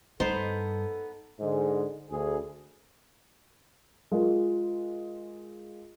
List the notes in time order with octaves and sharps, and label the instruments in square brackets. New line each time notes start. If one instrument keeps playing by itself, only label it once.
[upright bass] G2 [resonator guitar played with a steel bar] B3 D#4 [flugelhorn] A4 [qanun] C5
[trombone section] G#2 D3 G#3
D2 G#4
[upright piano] G#3 F4 A#4